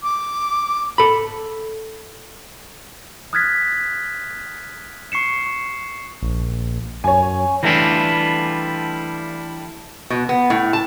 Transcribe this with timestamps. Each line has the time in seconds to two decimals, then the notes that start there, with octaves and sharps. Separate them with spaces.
0.03 D6
0.98 A4 B5
3.33 D#6 F6 F#6 G#6 A6 B6
5.12 C#6 C7 C#7 E7
5.46 C#6
6.22 A#1
7.04 F#2 C#5 G#5
7.63 E3 G3 A3 D4 E4 F4
10.10 B2
10.29 B3
10.50 A2
10.73 A5